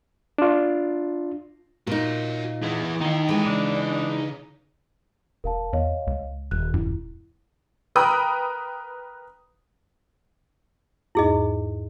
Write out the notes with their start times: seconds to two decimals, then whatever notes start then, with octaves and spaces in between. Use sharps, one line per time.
0.38 D4 F4
1.87 A#2 D#4 F#4 A#4
2.63 E3 E4 G#4
3.01 D#3 D#4 F5
3.29 E3 G#3 G5 G#5
3.46 C#3 D4
5.44 E1 A#4 F5 A5
5.73 E2 C#5 D#5 F5
6.07 C#2
6.51 D#1 F#6
6.74 F#2 E4
7.96 A#4 B4 G5 B5 D#6
11.15 E2 G#2 D#4 E4 G#4 D#5